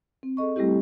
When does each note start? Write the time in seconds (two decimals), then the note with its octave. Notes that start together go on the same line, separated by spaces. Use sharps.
0.23 C4
0.37 G#4 A4 D#5 C#6
0.56 G3 A3 C4 E4 G4